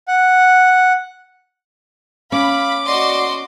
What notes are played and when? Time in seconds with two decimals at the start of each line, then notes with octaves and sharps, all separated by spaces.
0.08 F#5
2.32 C#4 F5 B5 D6
2.87 F#4 D5 D#5 C6